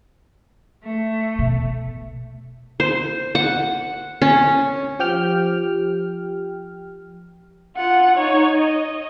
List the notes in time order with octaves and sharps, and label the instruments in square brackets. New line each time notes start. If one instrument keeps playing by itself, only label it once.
[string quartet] A3
[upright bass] B2
[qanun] C5
F#5
C#4
[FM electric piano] F3 G4 G5 F6
[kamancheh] F4 F#5
D#4 C#5
D#5